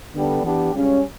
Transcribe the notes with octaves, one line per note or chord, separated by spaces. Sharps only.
D3 G3 B3 D4 A4
E3 B3 D4 G4
C#2 C#3 G3 C#4